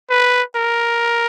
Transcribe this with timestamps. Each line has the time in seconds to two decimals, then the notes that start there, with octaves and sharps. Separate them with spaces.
0.10 B4
0.56 A#4